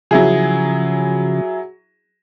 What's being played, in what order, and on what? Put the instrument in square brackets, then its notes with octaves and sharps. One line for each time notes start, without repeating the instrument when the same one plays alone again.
[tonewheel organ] C#3 F3 [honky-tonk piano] F#3 E4 G#4